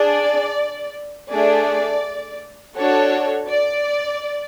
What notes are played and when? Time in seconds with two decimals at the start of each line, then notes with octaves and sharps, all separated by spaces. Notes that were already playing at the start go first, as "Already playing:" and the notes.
Already playing: D4 G#4 D5
1.31 A3 D4 G#4 D5
2.76 D4 F#4 A4 C#5
3.49 D5